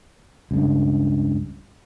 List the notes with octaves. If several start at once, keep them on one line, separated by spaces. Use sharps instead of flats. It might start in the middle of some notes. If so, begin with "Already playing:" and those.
C#2 G2